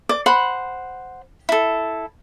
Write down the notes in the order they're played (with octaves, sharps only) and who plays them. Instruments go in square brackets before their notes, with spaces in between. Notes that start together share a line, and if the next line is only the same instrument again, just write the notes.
[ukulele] D5 [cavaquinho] D6
[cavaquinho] C5 F#5 [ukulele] B5
[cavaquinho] E4 A4